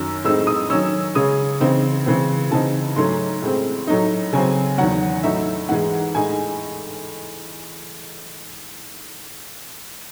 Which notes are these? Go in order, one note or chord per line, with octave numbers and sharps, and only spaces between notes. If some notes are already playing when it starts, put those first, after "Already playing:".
Already playing: F#2 D#3 F#3 E6
A2 G#3 C4 D#4 E6
D#6
D#3 F#3 C#4 E6
C#3 G#3 C#4 D#6
C#3 E3 C4 D#4
C#3 E3 G#3 C4
C#3 E3 C4 D#4 A5
G#2 F#3 A3 C#4 C6
A2 G#3 C4
A2 F#3 A3 D#4
C#3 F#3 C4 G#5
E2 D#3 F#3 F#5
A2 F#3 A3 D#4 E5
G#2 E3 G#3 F#5
A2 G#3 D#4 G#5